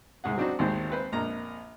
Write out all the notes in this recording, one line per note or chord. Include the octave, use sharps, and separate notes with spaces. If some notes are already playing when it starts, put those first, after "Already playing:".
C2 G#2 G#4 F#5
F#3 C4 D4 D#4 F#4
G#1 D#2 D#3 C5
C4 B4 C5
A#1 F2 A#3 A#5